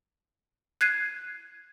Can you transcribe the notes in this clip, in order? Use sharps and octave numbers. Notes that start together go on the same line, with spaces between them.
F#6 G#6 C7 D#7